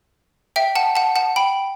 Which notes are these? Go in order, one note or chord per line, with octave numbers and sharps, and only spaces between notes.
E5 G5
F#5 A5
F#5 A5
F#5 A5
G5 B5